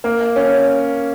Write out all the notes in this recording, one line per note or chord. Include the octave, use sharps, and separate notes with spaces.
A#3
C#4